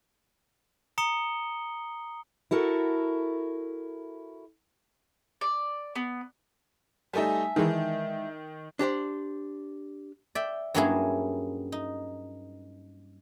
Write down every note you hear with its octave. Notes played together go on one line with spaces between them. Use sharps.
A#5 D#6 C#7 G7
E4 F#4 A4 A#4
D5
B3
G3 A3 D#4 E5 G#5 A5
D#3 E3 G#3 D#4
D4 G4 C5 D5
D5 E5 G5
G2 F#3 A#3 C#4 E4 G#4
D#4